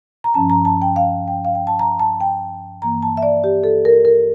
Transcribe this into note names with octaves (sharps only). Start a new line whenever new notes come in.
A#5
G2 F3 C#4 A5
A#5
A5
G5
F5
G5
F5
G5
A5
A#5
A5
G5
G2 E3 A#3 A#5
A5
E5
D5
G4
A4
A#4
A#4